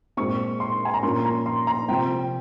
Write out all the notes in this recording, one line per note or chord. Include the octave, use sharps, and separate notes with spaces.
A#2 G#3 C4 C#6
C6
G#5
A#5
A#2 F3 A#3 C#4 C6
A#5
C6
A#5
C3 F3 C4 G5